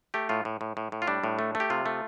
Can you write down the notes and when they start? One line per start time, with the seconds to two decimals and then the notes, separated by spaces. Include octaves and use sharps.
0.14 A3 G4
0.29 A2 F4
0.45 A2
0.61 A2
0.77 A2
0.92 A2
1.02 F4
1.07 G3 D4
1.24 A2
1.39 A3
1.55 A3
1.60 G4
1.70 C3 F4
1.86 A3